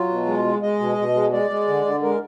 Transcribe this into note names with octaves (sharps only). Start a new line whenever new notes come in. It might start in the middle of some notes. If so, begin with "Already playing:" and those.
Already playing: F#3 F4
B2
G#3
G#3
G#3 D#5
B2
B2
G#3
G#3 D5
G#3
D3
D3
G#3 A#4